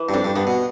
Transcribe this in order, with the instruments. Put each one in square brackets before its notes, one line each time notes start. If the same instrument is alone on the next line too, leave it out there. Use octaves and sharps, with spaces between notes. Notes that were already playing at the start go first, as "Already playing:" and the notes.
Already playing: [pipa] E3
[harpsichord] G2
[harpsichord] F2 [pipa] D4
[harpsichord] G2
[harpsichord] G2 [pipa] B3
[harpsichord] B2